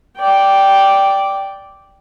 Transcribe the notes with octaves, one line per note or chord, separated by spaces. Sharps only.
D5 G5